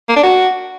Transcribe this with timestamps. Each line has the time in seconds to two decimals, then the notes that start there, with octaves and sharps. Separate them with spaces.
0.09 A#3
0.16 D4
0.23 F#4